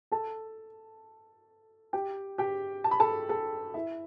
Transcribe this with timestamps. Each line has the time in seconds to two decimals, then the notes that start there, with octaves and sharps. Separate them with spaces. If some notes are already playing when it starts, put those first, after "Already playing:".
0.11 A4 A5
1.93 G4 G5
2.38 G4 G5
2.84 A5
2.91 B5
3.00 A4 A5
3.29 A4 A5
3.74 E4 E5